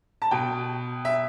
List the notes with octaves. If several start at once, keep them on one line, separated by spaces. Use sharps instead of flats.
A5
B2 G5
E5